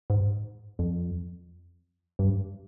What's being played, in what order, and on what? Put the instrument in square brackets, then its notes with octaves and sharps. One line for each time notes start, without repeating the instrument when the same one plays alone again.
[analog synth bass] G#2
F2
G2